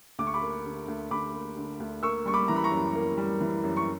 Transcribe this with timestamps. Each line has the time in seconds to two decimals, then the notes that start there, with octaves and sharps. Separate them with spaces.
0.19 D2 D6
0.27 C#6
0.34 B5 D6
0.42 A#3
0.65 D3
0.88 D2
1.11 D2 B5 D6
1.34 A#3
1.57 D3
1.80 D2
2.03 A#3 C#6 E6
2.26 G3 C#6
2.34 B5 D6
2.48 E3 A#5
2.56 B5
2.64 A#5 C#6
2.71 F#2
2.95 A#3
3.17 G3
3.41 E3
3.64 F#2
3.77 C#6